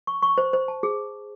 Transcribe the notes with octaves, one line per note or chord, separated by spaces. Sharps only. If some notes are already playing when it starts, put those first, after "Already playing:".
C#6
C#6
C5
C5
A5
G#4